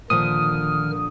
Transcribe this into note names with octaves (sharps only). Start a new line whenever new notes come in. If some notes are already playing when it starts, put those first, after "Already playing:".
A#2 D3 D#3 F3 D#6 F6